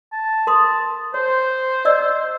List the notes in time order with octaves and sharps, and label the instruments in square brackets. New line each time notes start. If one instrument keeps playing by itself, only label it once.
[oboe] A5
[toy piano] A#4 C6 D#6
[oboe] C5 [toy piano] C#5
[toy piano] D5 D#5 E6